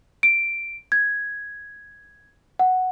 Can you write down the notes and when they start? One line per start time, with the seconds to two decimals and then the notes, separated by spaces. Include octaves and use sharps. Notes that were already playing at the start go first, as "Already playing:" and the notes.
0.23 D7
0.92 G#6
2.59 F#5